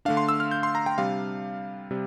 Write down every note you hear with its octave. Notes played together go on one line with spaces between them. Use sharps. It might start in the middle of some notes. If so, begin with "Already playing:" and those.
D3 A3 D4 F5
C6
E6
F6
G6
C6
A#5
G5
C3 G3 D4 F5
C3 G3